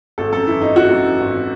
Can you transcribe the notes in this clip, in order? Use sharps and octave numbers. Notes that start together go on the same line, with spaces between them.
G#1 A4
F#2 A4
E3 E4
G#1 D#4
G#1 F#4
F#2
E3
G#1